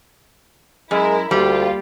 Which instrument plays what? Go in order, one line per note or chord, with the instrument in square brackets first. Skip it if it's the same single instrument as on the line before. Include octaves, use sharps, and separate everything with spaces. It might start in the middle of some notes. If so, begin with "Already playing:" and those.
[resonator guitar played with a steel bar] F#2 [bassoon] G#3 [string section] E4 A#4
[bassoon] D2 [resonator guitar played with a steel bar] G3 [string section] A#3 F4 G4